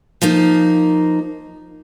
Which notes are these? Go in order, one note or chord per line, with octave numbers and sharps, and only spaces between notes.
F3 A#3 D#4